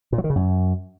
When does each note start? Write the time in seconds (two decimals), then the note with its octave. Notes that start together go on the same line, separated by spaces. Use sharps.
0.12 A#2
0.18 F#3
0.24 D#3
0.30 C#3
0.36 F#2